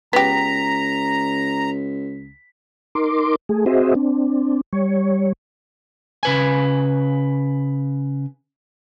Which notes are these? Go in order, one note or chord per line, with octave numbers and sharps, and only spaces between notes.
C#2 B3 G4 A#5 B6
D#4 A#4 C6 D6
A3 G#4
C4 F#4 G#4 C5 D#5 E5
C4 D4
G3 C#5
C#3 B4 G#5